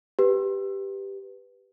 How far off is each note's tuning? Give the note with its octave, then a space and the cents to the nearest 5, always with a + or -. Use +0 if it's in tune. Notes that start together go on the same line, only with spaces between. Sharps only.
G4 +0 B4 +0